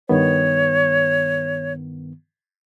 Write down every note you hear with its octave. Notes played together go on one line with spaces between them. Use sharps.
G2 D#3 B3 C#5